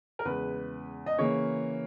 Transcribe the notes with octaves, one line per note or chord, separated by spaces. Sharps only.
A#4
E2 C#3 G#3 B4
D#5
C#3 E3 A#3 C#5